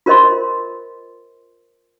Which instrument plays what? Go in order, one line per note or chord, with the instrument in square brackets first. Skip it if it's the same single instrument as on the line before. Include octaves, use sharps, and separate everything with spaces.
[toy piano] F4 A#4 C5 D#5 C6